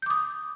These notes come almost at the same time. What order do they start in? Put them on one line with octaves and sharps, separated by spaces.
G6 D6 D#6